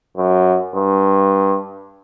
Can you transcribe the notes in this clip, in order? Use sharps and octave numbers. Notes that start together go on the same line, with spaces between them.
F#2
G2